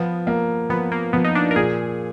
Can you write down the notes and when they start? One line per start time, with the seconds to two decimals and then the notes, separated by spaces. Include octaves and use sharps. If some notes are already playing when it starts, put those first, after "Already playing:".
Already playing: F3 B3
0.27 A#3
0.70 F3 B3
0.92 A#3
1.13 F3 B3
1.24 D#4
1.35 D4
1.51 A#4
1.56 A#2 G#4